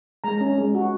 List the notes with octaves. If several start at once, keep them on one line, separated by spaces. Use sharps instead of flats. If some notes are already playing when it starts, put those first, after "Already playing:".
G#3 A#5
C#4
G#3
F#4